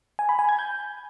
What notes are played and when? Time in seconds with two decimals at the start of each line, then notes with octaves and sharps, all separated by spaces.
0.19 G#5
0.29 B5
0.39 G#5
0.49 G#6
0.59 G6